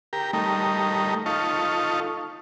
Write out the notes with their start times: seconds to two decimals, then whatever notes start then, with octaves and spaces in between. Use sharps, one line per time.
0.13 G4 A#4
0.33 G3 A3 D#4 A#4
1.26 D#4 F4 A4 C#6